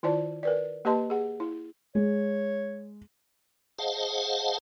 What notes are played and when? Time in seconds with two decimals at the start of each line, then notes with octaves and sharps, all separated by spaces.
0.03 D#3 E4 F4 C5 D5 A5
0.43 A#4 B4 D5
0.85 A#3 G4 B4 D#5 A5 C6
1.10 G#4 F#5
1.40 E4
1.95 G#3 C#5
3.78 G#4 C5 D#5 F5 F#5 A5